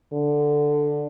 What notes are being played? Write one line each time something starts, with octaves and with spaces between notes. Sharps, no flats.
D3